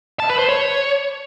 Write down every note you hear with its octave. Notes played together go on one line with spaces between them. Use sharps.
A5
B4
C5
C#5